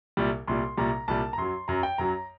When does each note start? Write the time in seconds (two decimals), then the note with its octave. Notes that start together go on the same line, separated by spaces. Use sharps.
0.17 C2 A#2 G3
0.48 C2 A#2 G3 C6
0.77 C2 A#2 G3 A#5
1.08 C2 A#2 G3 A5
1.33 A#5
1.38 F#2 F#3 C6
1.68 F#2 F#3 A#5
1.83 G5
1.98 F#2 F#3 A#5